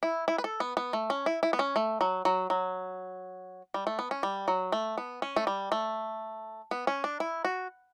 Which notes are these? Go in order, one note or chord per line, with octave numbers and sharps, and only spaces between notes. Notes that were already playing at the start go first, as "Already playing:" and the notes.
E4
E4
B4
A4
B3
B3
A3
C#4
E4
E4
B3
C#4
A3
F#3
F#3
F#3
G3
A3
B3
C#4
G3
F#3
A3
B3
C#4
A3
G3
A3
B3
C#4
D4
E4
F#4